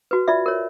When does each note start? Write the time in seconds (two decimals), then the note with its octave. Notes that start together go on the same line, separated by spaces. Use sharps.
0.11 F#4 B4
0.28 F4 D5 E5
0.46 A#4 C#5